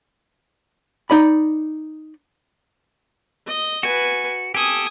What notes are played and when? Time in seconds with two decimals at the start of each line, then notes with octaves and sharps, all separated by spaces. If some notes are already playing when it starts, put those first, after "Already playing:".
1.10 D#4 D5 B5
3.47 D#5
3.83 F#4 B4 G#5
4.55 G4 A4 G#5 D#6